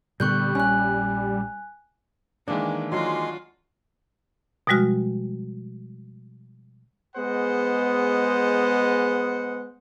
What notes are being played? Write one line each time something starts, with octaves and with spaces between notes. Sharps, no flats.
A#2 D3 G3 B3 C#6 F#6 G6
A#1 C#4 G#5 F#6
D#3 E3 G#3 A#3 D4
F#3 G#3 F4 F#4 C6
B2 F3 G3 G#3 F#4 F6
G#3 B3 G#4 C5 D#5 F#5